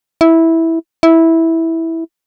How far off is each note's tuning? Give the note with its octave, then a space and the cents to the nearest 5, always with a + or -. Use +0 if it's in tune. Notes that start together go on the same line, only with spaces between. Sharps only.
E4 -10
E4 -10